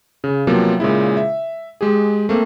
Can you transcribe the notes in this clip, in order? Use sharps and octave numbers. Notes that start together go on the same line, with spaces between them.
C#3
C3 F3 F#3 A#3 B3
A#2 C#3 G#3 E4
E5
G#3 G4 G#4
A3 A#3 C4